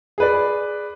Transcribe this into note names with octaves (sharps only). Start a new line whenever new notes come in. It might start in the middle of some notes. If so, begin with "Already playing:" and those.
G#4 B4 D5